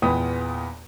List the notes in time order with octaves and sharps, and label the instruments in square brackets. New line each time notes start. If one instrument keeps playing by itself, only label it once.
[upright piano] E2 A#2 B3 G5 B5 D#6